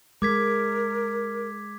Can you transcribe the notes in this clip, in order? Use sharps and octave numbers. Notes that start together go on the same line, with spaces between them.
G#3 A#4 D6 G#6 B6